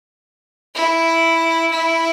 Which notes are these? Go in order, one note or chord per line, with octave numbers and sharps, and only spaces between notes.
E4
E4